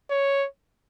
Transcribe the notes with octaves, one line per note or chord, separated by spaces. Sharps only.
C#5